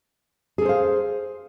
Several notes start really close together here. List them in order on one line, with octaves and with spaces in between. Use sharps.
G#4 A4 C5 F5